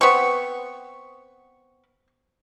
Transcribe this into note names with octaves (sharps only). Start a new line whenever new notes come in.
B3 C4 C#6